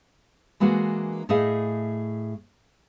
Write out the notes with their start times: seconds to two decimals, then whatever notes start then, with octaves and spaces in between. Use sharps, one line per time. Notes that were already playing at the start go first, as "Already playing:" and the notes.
0.60 E3 G#3 A#3 D4 F#4
1.29 A2 A3 G#4 D#5 F5 G#5